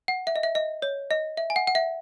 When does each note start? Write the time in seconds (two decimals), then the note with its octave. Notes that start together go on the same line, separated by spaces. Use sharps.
0.08 F#5
0.27 E5
0.36 D#5
0.43 E5
0.55 D#5
0.82 C#5
1.11 D#5
1.37 E5
1.50 G#5
1.56 F#5
1.67 F#5
1.75 E5